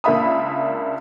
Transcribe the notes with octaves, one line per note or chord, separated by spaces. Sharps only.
C#2 A#3 D4 E5 B5 D#6